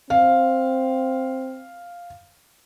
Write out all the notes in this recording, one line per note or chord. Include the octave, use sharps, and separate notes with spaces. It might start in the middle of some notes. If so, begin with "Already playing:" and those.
C4 F5